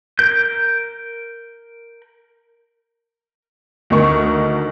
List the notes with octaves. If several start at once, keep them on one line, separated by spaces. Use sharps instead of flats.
A#4 G6
D2 D#3 D#4 A#4 C#6